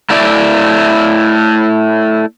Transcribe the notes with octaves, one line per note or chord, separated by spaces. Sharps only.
A3 E4 D5